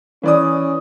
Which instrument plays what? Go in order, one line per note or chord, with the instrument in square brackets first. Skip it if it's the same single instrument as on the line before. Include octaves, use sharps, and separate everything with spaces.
[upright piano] E3 D5 D#6 [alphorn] C#4